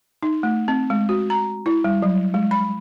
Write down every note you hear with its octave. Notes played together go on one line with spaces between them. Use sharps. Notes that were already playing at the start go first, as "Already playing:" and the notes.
D#4
A3
C4
G#3
F#4
A#5
E4
G3
F#3
G#3
B5